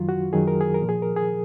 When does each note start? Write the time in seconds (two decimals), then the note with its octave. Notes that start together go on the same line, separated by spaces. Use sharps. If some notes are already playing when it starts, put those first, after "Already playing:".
Already playing: F#2 D#3 F#3 F4
0.09 F#4
0.33 F#2 D#3 F#3 G#4
0.48 A#4
0.61 G#4
0.74 A#4
0.82 A#2 F3
0.89 G#4
1.02 A#4
1.16 G#4